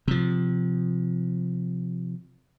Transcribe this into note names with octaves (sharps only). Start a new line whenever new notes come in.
C3 F3